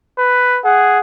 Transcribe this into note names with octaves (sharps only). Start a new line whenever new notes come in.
B4
G#4 F#5